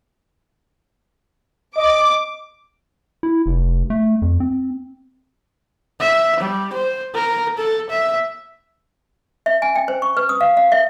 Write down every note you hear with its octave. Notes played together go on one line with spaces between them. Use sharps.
D#5 D6
E4
F1
A3
F2
C4
E5
G3
C5
A#4
A4
E5
E5
G#5
G5
C5
C#6
B4
D#6
F5
F5
E5